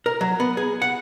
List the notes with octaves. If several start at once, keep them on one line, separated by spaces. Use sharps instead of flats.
A#4
F#3
B3
G#4
F#5